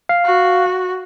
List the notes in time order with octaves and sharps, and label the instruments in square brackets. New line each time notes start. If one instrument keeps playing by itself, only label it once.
[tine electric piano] F5
[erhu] F#4